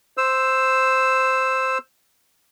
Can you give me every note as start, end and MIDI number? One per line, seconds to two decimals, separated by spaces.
0.17 1.78 72
0.17 1.78 88